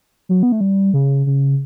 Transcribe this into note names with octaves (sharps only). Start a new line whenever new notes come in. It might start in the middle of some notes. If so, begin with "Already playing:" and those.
F#3
B3
A3
G3
C#3
C#3